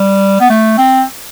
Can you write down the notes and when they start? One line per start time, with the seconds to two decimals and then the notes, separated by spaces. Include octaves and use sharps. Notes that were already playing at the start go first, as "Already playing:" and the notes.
Already playing: G3
0.40 B3
0.50 A3
0.78 C4